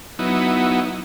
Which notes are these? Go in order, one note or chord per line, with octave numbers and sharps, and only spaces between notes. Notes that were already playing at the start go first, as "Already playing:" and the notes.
F#3 B3 D#4 E4